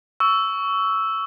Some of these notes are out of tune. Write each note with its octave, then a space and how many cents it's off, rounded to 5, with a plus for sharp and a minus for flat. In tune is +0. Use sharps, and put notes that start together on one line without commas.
C#6 +20 E6 +0